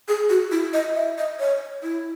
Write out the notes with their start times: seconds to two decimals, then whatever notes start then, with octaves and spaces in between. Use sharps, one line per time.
0.08 G#4
0.30 F#4
0.51 E4
0.73 D#5
0.95 E5
1.18 D#5
1.40 C#5
1.83 E4